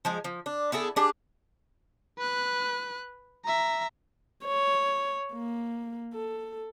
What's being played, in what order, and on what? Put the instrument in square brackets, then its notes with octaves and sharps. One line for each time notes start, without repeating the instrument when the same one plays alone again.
[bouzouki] F3 G#3 G#4
F3
D4
B3 E4 G#4 A4
D4 G4 G#4
[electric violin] B4 F#6
E5 A#5
[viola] C#5
A#3
A4